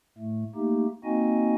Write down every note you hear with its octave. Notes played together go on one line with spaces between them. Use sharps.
A2 A3
A3 A#3 D#4 G4
A#3 C4 D#4 F#4 D#5 G#5